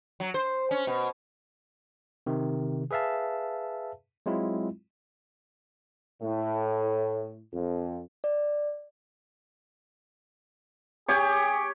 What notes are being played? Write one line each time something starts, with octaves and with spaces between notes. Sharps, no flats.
F#3
C5
C#4
B2
C3 D#3
G#4 B4 E5 F5 A5
F#3 G#3 C4 E4 F4
A2
F2
D5
G4 G#4 C#5